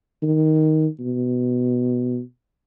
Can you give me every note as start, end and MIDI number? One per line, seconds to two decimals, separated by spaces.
0.23 0.87 51
1.00 2.20 47